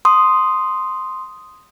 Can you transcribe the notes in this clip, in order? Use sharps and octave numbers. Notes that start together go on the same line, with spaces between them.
C6 D#6